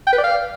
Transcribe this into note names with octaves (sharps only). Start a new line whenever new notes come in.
G5
B4
D5
F5